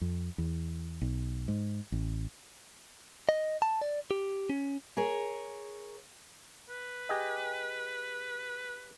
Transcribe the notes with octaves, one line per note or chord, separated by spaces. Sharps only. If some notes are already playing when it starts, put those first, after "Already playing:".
F2
E2
B1
G#2
A1
D#5
A5
D5
G4
C#4
G#4 A#4 C#5
B4
G4 G#4 D#5